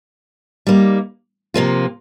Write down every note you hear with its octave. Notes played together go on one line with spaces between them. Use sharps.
G3 A#3 D#4
C3 F3 A#3 F4